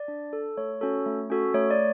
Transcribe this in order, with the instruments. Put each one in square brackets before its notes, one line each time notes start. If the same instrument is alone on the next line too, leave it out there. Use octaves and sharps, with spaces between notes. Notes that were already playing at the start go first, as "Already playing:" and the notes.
Already playing: [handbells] D5
D4
A4
A3 C#5
C#4 F#4 A4
A3
C#4 F#4 A4
A3 C#5
D5